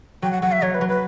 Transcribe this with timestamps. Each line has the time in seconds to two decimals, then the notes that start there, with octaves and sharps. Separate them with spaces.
0.22 F#3 G5
0.31 F#5
0.42 F#3 F#5
0.52 E5
0.62 F#3 C#5
0.74 B4
0.81 F#3
0.88 B4